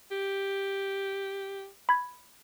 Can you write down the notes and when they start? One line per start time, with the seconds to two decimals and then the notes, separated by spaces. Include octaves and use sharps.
0.11 G4
1.89 B5 G#6